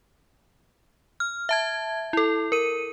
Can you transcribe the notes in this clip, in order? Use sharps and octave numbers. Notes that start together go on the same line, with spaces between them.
F6
E5 A5 G#6
E4 A4
A#4 D#7